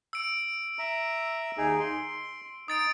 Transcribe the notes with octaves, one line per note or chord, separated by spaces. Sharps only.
E6 D7
E5 A#5
D#2 D#4 G#4
C6
D#4 D#6 A6 D7